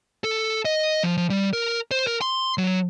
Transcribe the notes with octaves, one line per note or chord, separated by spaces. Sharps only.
A4
D#5
F3
F3
G3
A#4
C5
A#4
C6
F#3